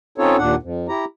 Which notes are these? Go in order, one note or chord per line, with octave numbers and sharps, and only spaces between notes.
C4 C#4 D#4 F4 A4 C#5
D#2 A#2 D4 F#5
F2
E4 G4 A#5